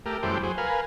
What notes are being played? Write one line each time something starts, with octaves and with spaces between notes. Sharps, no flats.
A3 G4 A#4
F#2 E3 G3 A3 C5 G5
F#3 G#4 C5
A#4 B4 F5 G#5